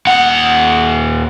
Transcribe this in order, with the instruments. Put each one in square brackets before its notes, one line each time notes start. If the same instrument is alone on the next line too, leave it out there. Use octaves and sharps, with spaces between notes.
[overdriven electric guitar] D#2 F#5